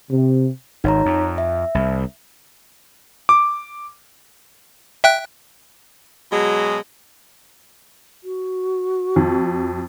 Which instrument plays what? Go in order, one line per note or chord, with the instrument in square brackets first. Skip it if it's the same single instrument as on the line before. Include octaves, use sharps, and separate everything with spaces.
[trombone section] C3
[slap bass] G#1 [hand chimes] D#4 C#5 A#5
[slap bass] F2
[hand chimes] E5
[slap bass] C2
[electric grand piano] D6
[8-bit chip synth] E5 G5 F#6
[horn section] B2 F#3 G#3
[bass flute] F#4
[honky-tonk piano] F2